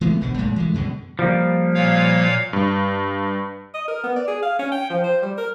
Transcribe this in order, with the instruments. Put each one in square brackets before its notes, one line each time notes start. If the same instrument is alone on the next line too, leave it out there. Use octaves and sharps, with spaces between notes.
[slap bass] E3 G#3 A3 B3
G#1 B2 D3
F#2 A#2 G#3 A3
E3 G#3 A3
F#2 B2 D3 G#3
[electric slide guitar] F3 G3 A#3
[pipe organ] A#2 C#5 F5
[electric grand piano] G2
[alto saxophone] D#5
A#4
B3
D5
G#4
F5
C#4
G5
F3
C5
G3
A#4